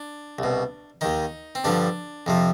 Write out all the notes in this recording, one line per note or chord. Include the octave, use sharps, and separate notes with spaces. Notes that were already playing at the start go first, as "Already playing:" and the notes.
Already playing: D4
C2 B2
D#2 D#3 D#4
C4
G2 D3 F3 D4
F2 C3 F3